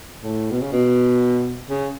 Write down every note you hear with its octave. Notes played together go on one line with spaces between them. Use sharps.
A2
B2
C#3
B2
C#3